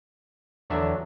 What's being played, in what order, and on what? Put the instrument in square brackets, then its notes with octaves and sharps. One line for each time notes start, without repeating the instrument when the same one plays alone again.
[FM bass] E2 [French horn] D3 [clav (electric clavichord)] F#3 D4 E5